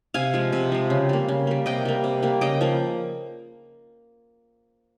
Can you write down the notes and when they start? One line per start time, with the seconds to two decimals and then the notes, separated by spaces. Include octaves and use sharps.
0.14 C3 F5 G#5
0.34 F3 G#3
0.53 C3
0.72 F3 G#3
0.90 C#3
1.09 G3 A#3
1.29 C#3
1.47 G3 A#3
1.66 C3 D#5 G5
1.85 G3 A#3
2.04 C3
2.23 G3 A#3
2.41 C#3 D#5 G5
2.61 F3 A#3